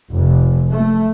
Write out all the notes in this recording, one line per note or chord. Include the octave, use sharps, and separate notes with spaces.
F1
A3